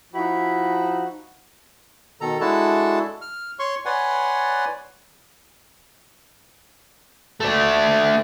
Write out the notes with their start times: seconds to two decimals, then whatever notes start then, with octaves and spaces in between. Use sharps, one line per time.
0.14 F3 D#4 E4 F#4
2.21 B2 D#3 A4 A#5
2.41 G#3 D4 E4 F#4 A4 A5
3.22 F6
3.59 C#5 C6 C#6
3.85 B4 C#5 D5 F#5 G#5 C6
7.40 A3 D4